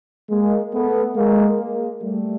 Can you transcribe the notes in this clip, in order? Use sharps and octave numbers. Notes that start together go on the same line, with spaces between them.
G#3 A#3
A3 B3
G#3 A#3
G#3 A#3
G3 A3